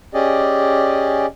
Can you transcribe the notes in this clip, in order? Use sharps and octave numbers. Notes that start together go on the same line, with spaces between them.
C#4 G4 G#4 D5 D#5